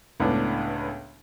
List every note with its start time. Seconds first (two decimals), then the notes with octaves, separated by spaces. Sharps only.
0.20 C#2 A2 B3 D4